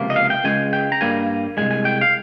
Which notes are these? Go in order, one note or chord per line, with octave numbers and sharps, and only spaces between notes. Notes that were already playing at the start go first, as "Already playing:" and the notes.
Already playing: C#2 C3 F3 A#3
D#5
F5
G5
C#2 C#3 G#3 G#5
G5
A#5
G2 G3 A#3 G#5
C2 A#2 G#3 G#5
G#5
G5
F5